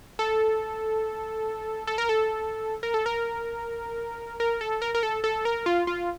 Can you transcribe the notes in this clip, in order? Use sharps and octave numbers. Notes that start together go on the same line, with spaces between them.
A4
A4
A#4
A4
A#4
A4
A#4
A#4
A4
A#4
A#4
A4
A4
A#4
F4
F4